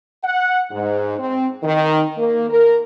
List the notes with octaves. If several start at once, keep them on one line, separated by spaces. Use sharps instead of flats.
F#5
G#2
C4
D#3
A#3
A#4